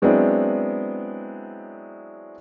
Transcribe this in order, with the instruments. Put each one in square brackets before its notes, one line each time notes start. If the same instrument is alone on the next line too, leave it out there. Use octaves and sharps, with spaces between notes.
[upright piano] F#3 G#3 B3 C4 D4 E4